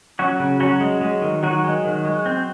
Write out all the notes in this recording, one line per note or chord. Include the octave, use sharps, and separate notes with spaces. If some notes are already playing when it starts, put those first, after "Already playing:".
F#3 C#4 F#4
C#3
F#3 C#4 F#4
G#3
G#3
D#3
D#3 F#3 F#4
G#3
D#3
G#3
C4